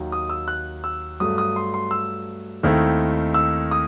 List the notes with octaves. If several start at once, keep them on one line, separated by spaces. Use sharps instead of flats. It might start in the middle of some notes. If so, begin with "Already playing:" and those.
Already playing: D#2 D#3 F#3
D#6
E6
F#6
E6
G2 F#3 A3 D#6
D#6
C6
C6
E6
D#2 D#3 A3 C4 E4
E6
D#6